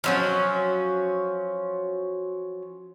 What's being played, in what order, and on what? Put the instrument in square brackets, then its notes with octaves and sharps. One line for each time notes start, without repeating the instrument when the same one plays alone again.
[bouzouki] F3 F#3 C#4